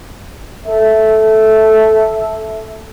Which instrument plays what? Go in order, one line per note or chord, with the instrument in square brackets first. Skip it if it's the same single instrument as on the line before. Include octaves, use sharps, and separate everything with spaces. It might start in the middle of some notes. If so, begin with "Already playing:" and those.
[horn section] A4 E5